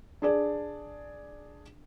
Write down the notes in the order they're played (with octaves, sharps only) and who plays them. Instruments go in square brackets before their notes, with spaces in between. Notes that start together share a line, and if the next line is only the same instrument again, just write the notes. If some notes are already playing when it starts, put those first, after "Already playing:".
[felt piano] D4 G#4 D5